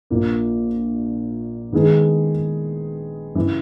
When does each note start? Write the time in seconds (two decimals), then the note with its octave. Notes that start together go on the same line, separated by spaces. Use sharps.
0.10 A#1 A#2 A#3
1.72 D#3 G#3 B3 D#4 G#4
3.35 C#3 E3